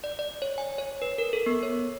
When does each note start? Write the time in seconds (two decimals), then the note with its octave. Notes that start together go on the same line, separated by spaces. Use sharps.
0.04 D5
0.19 D5
0.42 C#5
0.58 G#5
0.78 C#5
1.02 B4
1.18 A#4
1.33 A4
1.46 B3
1.63 C#5